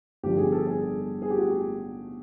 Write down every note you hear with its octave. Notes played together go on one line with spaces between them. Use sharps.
G1 G2 D3 F3 G4
G#4
A4
G#4
G#4
G4
F#4